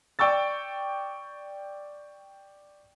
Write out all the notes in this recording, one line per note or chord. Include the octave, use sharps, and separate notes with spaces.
D5 G5 C#6 E6 A6